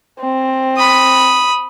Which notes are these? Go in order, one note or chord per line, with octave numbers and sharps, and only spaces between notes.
C4
B5 D#6